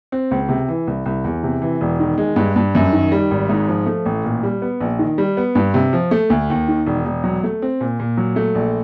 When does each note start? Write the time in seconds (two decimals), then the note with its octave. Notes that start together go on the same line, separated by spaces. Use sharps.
0.12 C4
0.31 C#2
0.49 C3
0.68 E3
0.87 C2
1.06 C2
1.24 E2
1.43 C3
1.62 E3
1.81 E1
2.00 D#3
2.18 G#3
2.36 G2
2.56 G2
2.75 F#2
2.93 D#3
3.12 G3
3.31 G#1
3.49 G#2
3.68 F3
3.86 A3
4.06 A1
4.24 A#2
4.43 G3
4.62 B3
4.80 A#1
4.99 D#3
5.18 G3
5.37 B3
5.55 G2
5.74 C3
5.93 F3
6.11 A3
6.30 D2
6.50 D#2
6.68 D#3
6.86 E1
7.06 E1
7.24 F#3
7.44 A3
7.62 C4
7.81 A#2
8.00 A#2
8.17 F#3
8.36 A3
8.55 A#1